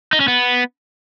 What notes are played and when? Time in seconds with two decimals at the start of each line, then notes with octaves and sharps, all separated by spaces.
0.13 D#4
0.20 C#4
0.28 B3